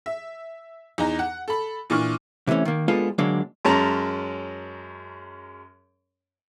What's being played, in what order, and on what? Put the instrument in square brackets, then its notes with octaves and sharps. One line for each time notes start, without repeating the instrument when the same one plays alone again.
[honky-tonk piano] E5
E2 D#4 A#5
F#5
A4 B5
A#2 E3 D4 C#6 F6
[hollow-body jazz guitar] C3 E3 G#3 A3 C#4
D#3 A#3
G#3 A#3 B3 D4 F4 A4
D3 F#3 G#3 A#3 D4
[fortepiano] F#2 G#3 C#4 A5 A#5